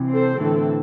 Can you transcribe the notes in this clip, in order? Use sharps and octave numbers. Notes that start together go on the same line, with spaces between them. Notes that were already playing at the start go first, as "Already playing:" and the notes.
Already playing: C3 E3
C4 A4 C5
A2 D3 E3 C4 A4